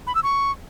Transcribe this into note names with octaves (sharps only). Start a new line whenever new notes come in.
B5
E6
C#6